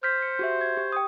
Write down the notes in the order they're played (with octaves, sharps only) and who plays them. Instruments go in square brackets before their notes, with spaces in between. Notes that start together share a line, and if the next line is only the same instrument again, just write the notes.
[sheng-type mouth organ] C5 [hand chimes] F6 G6 B6
[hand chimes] C#7
F#4 G4 E5
G#6
G4
G5 D#6